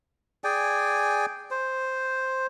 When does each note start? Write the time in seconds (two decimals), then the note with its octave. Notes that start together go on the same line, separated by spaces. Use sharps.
0.44 G#4 D5 G5 G#5
1.51 C5